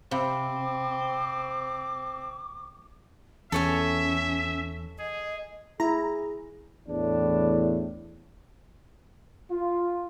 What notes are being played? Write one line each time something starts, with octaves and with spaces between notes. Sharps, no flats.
C3 C4 C5 F5 B5 D6
E2 C#4 A4 C#5 E5 G#5
G#4 D#5
E4 G#4 A#5
E2 A2 D4
F4